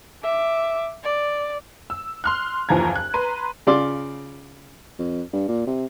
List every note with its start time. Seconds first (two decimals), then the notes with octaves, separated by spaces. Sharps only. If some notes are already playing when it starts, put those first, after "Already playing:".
0.23 E5 D6
1.04 D5
1.90 E6
2.24 C6 F6 F#6
2.69 F#1 D#2 E3 F3 A#5 G#6
2.96 F#6
3.14 B4 A#5 C6 D#7
3.67 C#3 F4 D5 C6 D6
4.99 F2
5.33 G2
5.49 A#2
5.67 C3